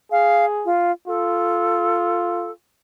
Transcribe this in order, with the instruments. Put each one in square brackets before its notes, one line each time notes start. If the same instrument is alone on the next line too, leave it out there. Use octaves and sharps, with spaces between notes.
[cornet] G#4 [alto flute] F5
[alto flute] F4
[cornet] F4 [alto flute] A4